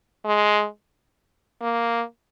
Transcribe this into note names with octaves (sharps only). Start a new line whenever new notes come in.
G#3
A#3